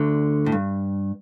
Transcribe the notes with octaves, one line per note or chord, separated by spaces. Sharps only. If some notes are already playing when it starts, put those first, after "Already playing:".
Already playing: D2 D3
A2
G2